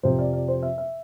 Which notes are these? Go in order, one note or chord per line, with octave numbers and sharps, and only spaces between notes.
F2 C3 F3 C5
D5
D5
C5
E5
E5